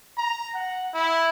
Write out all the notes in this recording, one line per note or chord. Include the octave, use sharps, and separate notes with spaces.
A#5
F#5
E4